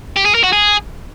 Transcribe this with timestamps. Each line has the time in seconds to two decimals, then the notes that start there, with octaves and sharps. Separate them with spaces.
0.16 G4
0.25 G#4
0.34 A#4
0.44 F#4
0.53 G#4